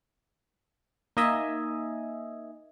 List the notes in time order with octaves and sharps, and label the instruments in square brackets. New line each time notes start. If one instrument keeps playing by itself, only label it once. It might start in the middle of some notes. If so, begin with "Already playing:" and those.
[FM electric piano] A#3 D#4 D#5 E5 G#5